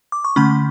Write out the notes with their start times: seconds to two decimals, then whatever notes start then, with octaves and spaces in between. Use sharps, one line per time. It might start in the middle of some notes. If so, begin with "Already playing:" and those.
0.12 D6
0.25 C#6
0.36 D3 A3 C#4 B5